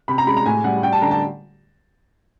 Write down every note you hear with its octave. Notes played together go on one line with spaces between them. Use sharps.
C3 B5
A#5
G#3 B5
A#5
A2 G#5
G3 F#5
G3 G5
A5
D3 A#5
A5